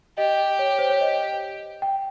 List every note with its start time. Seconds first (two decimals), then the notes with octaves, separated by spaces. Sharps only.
0.18 G4 D#5
0.59 C#5
0.79 C5
0.90 C#5
1.01 D#5
1.82 G5